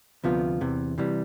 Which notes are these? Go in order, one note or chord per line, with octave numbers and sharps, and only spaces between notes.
D2 C3 F3 B3 F4
E2 C3 E3
C3 E3 G3